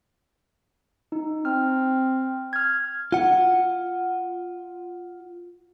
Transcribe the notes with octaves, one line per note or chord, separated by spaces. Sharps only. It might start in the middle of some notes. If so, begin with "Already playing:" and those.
D#4
C4 F6
F6 G#6
F4 F#5